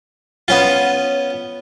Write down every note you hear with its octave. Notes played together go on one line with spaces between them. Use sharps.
B3 C#4 F4